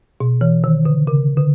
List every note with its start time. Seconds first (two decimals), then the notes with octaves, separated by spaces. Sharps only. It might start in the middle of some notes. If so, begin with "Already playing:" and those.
0.20 B2
0.41 E3
0.64 D#3
0.85 D3
1.07 C#3
1.37 D3